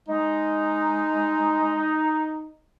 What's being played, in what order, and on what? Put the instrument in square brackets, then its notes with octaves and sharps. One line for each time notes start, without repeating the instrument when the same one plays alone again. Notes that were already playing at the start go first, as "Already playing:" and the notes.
[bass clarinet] G#3 [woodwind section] D#4